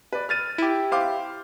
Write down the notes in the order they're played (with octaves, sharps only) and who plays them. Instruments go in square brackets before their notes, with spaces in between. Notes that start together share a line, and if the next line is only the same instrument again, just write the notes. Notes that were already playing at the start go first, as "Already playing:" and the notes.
[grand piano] B4 D5
F6 A6 D#7
[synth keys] E4 G4
[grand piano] C5 F5 D6